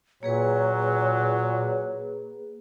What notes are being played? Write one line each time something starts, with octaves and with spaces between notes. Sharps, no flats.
A#2 F#3 A#3 G#4 B4 C#5